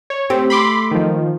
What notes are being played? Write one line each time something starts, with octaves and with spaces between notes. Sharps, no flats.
C#5
A3 C4 G4
B5 C6 D6
D#3 F3